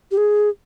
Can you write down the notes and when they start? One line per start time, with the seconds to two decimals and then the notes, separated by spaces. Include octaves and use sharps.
0.11 G4
0.17 G#4